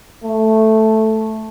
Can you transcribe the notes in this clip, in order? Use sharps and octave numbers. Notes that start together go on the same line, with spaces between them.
A3